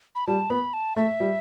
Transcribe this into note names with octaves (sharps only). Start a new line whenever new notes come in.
B5
G3 A5
B3 B5
A5
A3 E5
G3